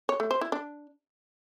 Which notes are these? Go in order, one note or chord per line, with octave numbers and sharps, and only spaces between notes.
C#5
A3
C5
E4
D4